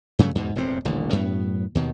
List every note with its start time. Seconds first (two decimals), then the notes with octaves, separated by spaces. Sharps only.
0.19 G2 C#3 F#3 A3
0.35 E2 G#2 B2
0.55 E1 F2 A2 C4
0.85 D#1 A1 D3
1.13 F#2 A2 B3
1.75 D#2 B2 D#3